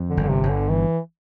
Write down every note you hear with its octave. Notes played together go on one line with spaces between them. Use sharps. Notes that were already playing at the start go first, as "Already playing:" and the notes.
Already playing: F2
D3
G1
D3
C3
G1
D3
E3